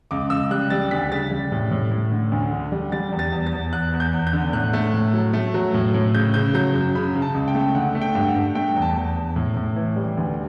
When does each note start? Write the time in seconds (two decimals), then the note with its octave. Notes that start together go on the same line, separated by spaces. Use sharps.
0.11 C#2 D6
0.30 C#2 E6
0.51 G3 F#6
0.70 G3 A6
0.91 D2 B6
1.11 C#3 A6
1.31 G3
1.52 A2
1.71 A2
1.91 A2
2.12 D3
2.32 D2
2.52 D3
2.72 G3
2.92 G3 A6
3.12 E2
3.19 A6
3.32 E2
3.47 A6
3.53 E2
3.73 E2 F#6
3.93 E2
4.00 G6
4.14 E2
4.27 G6
4.33 D3
4.53 A2 F#6
4.73 A3
4.94 A2
5.14 F#3
5.34 A3
5.54 F#3
5.74 A2
5.94 A2
6.15 C#3 G6
6.34 C#3 G6
6.54 F#3 G6
6.75 F#2
6.95 C#3 B5
7.15 C#3
7.22 A5
7.34 C#2
7.48 G5
7.55 A3
7.75 D3 F#5
7.95 A3
8.01 G5
8.15 G2
8.28 F#5
8.35 G2
8.55 A3 G5
8.76 E2
8.82 A5
8.95 E2
9.16 E2
9.36 A2
9.57 A2
9.76 E3
9.96 G3
10.17 D2